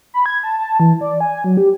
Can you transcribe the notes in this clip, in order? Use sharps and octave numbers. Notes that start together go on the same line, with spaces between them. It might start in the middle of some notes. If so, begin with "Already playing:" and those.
B5
G#6
A5
A5
E3
D5
G#5
F#3
G4